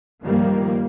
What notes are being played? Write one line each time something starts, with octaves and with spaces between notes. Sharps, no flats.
G2 D#3 F3 G3 A#3